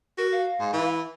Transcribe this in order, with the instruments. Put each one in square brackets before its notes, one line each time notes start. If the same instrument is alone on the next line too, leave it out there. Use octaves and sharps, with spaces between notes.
[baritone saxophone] F#4 [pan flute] A#4
[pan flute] F5
[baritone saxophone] G#2
E3